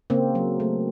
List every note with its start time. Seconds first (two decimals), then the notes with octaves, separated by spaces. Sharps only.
0.10 C#3 A#3 C4
0.35 F#3
0.60 A3